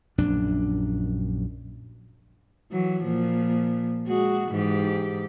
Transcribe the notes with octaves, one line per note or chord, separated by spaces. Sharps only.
A#1 F#2 D4
E3 F#3
A#2 F3
G#3 F#4 G#4
G#2 E3 G4